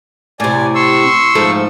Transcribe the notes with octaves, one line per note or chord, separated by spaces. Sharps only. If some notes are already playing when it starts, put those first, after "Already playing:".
A2 C3 D5 G#5
C6 C#6 E6
G#2 F3 A3